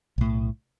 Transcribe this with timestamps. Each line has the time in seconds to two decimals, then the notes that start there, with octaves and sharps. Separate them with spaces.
0.18 B1 A2